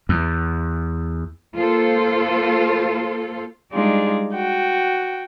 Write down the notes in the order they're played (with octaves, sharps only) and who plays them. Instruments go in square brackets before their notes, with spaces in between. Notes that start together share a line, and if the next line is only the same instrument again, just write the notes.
[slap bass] E2
[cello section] A#3 F4 A4 C5
[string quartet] G3 G#3 D4 D#4 F4 G#4
F#4 G5